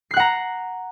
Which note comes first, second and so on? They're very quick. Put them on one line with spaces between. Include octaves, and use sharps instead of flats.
C7 F#6 F#5 A#5